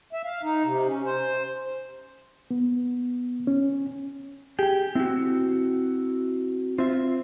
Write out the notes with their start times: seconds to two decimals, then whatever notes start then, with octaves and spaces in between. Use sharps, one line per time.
0.13 E5
0.24 F5
0.43 D#4
0.64 C3
0.88 C#4
1.05 C5
2.51 B3
3.47 C#4
4.59 G4 G#4 G5
4.95 C4 E4 F#4
6.78 C4 F4 E5